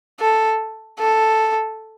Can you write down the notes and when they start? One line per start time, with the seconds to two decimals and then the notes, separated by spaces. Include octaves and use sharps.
0.20 A4
0.99 A4